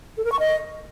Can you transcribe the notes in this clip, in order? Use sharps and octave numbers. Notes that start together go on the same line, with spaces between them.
A4
A#4
C#6
D#5